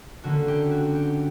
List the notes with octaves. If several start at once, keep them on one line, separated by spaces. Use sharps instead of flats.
D3 A#3 C#4 F#4
G4
F#4
G4